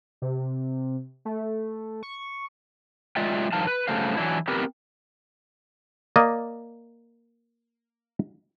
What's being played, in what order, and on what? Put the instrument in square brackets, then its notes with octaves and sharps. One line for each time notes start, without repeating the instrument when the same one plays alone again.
[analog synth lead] C3
A3
C#6
[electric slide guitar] F#3 G#3 F4 D5 E5 G5
G2 D#3 F3 F5 A5
B4
G2 C#3 F#3 A3 C5 F5
E3 F#3 D4 E4
B3 C4 G4 A#4 B4
[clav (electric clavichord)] A#3 D5 D#5